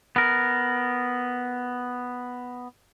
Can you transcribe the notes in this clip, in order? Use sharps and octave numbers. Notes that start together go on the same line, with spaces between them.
B3 A#4